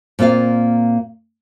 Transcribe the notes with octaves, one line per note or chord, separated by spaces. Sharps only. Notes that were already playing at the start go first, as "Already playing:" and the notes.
A#2 A#3 C4 F4 F5